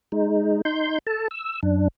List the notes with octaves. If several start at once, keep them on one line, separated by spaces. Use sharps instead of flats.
G#3 D#4
D#4 C6 G6
A4 A5
E6
F#2 D4